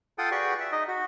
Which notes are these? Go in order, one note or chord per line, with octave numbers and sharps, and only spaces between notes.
F4 A4 F#5 G5 D#6
F#4 G#4 B4 D5 G5 C#6
E5
D#4 D#5
F#4